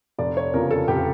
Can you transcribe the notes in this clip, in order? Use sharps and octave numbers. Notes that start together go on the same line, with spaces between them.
F1 D5
C#5
E2 C#3 F3 A#4
A4
F1 G4